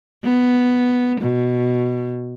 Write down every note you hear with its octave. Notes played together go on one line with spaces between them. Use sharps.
B3
B2